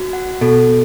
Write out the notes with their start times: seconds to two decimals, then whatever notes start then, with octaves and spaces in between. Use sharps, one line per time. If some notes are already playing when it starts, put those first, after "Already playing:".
Already playing: F#4
0.13 F#5
0.41 B2 A4